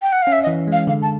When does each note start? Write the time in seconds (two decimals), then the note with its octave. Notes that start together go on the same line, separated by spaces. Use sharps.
0.02 G5
0.12 F#5
0.22 C#4 F5
0.33 E5
0.43 D#5
0.47 E3
0.68 G#3 F5
0.87 D3 F5
1.02 A5